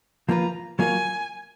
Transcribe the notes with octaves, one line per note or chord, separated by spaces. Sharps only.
F3 A#3 F4 B4 A#5
F#3 A#3 F4 A#4 C#5 G#5